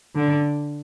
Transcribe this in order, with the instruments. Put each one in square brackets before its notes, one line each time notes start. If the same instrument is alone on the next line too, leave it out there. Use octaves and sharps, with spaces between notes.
[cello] D3